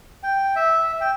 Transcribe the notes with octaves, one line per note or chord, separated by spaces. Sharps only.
G5
E5
G5